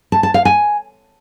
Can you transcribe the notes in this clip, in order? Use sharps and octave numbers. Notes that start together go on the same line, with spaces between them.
A5
A5
F5
G#5